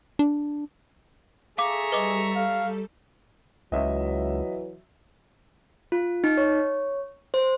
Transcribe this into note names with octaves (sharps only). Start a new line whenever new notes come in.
D4
G#4 A4 E5 F5 A#5 C#6 D6 B6
G3 A4 B4 D#5 D6
F5
C#2 E3 F#3 D#5 E5
F4
D#4
C#5
C5